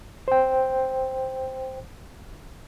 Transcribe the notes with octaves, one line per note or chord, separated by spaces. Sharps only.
C5 G5